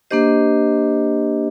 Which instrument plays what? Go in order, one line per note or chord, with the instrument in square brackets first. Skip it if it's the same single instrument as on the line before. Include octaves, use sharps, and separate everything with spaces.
[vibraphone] A#3 D4 G4 C5 D#5